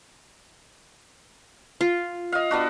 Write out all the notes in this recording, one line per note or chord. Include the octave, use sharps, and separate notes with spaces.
F4
D#5 F5
B3 D4 F#4